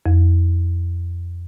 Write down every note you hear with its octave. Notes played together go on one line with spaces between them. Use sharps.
F2